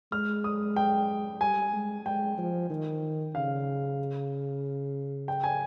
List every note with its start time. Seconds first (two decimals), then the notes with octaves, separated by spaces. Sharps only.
0.12 G#3 F6
0.44 D#6
0.76 G5
1.41 G3 G#5
1.73 G#3
2.06 G#3 G5
2.38 F3
2.70 D#3
3.35 C#3 F5
5.28 G5
5.44 G#5